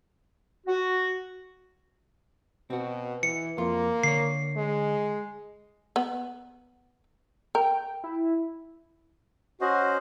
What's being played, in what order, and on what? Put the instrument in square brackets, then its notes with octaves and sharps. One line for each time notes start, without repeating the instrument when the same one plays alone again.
[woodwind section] F#4
[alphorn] B2 [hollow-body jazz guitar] C4 F#4
[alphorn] E3 [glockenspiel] C#7
[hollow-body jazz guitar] F2 F4 [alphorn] A#3
[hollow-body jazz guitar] D3 C#5 [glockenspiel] C7
[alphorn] G#3
[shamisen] B3
[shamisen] A#4 [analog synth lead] G5
[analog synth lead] E4
[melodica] C#4 C5 D#5 [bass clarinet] F#4